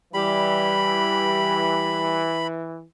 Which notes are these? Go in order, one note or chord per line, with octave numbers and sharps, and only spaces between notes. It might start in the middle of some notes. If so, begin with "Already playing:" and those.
E3 G3 G4 B5